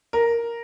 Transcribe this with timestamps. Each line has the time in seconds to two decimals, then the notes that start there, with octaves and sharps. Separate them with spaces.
0.13 A#4